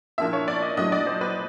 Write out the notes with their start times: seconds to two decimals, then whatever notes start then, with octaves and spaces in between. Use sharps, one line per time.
0.18 A#2 F3 A#3 D4 E5
0.33 C#5
0.48 D5
0.62 D#5
0.77 A#2 F#3 A3 D4 D#5
0.92 D5
1.07 C5
1.21 B4